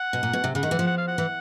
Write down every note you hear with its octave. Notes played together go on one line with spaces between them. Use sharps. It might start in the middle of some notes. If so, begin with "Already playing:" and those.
Already playing: F#5
B2
A#2
B2
C3
C#3 F#5
D#3
E3
F3
F#5
F5
F#5
E3